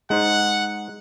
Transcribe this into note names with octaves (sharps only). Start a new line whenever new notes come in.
G#3 D#4 C5 F#5